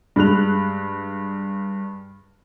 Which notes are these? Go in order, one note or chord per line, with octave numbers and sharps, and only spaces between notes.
G2 G#3 F#6 F7